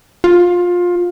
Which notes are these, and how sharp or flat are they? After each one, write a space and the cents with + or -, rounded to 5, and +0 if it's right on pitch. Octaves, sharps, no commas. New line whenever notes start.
F4 +20